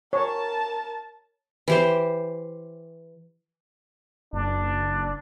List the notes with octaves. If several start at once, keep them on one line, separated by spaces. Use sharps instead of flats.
A#4 C#5 A5
E3 G4 C5
F#1 D4